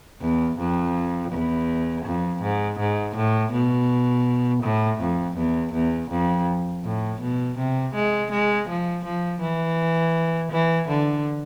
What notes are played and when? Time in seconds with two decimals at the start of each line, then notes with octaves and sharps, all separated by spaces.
0.21 E2
0.58 F2
1.31 E2
2.05 F2
2.42 G#2
2.79 G#2
3.16 A2
3.52 B2
4.63 A2
5.00 F2
5.37 E2
5.73 E2
6.10 F2
6.84 A2
7.21 B2
7.58 C3
7.94 G#3
8.31 G#3
8.68 F3
9.04 F3
9.41 E3
10.51 E3
10.88 D3